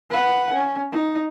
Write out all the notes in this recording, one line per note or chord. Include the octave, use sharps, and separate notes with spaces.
B4 F#5
C#4
D#4